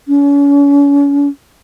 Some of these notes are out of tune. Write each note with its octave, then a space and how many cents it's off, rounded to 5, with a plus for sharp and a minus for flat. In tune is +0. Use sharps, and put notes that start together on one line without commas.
C#4 +40